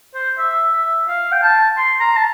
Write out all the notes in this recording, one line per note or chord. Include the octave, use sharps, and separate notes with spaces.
C5
E5
E5
F5
G5
A5
C6
A#5
A5